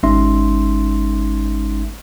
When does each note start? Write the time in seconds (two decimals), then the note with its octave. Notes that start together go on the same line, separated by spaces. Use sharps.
0.03 G#1 G#3 C#4 D#4 E5 C6